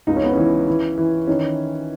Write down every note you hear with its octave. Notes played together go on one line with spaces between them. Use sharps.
C#2 D#4
C#4
B3
E3 C#4
E3
E3
D#3 C#4